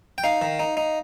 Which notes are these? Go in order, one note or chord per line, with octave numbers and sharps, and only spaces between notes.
G5
D#4 F5
D#3
D#4
D#4